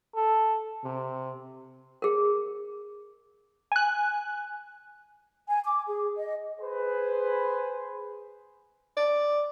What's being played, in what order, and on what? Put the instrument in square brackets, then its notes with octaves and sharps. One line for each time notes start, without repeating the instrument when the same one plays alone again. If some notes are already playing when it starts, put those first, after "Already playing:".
[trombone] A4
C3
[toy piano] G#4 A#4
[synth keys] G#5 F#6
[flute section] G#5
D6
G#4
D#5
[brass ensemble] G#4 B4 C5
[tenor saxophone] D5